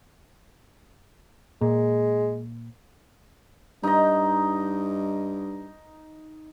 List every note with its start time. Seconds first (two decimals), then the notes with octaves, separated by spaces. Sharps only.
1.61 A#2 G#3
3.83 G2 D#4 D#5